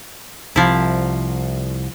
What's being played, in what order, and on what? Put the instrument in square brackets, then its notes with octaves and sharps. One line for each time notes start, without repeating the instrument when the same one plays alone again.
[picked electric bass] C2 [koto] F3 E4